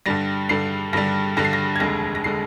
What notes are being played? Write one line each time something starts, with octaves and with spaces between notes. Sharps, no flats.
G2 D3 G3 A#6
G2 D3 G3 C7
G2 D3 G3 A#6
G2 D3 G3 A#6
C7
A#6
G#6
F1 D#2 D3 G#3 A#6
A#6
D3 G#3 C7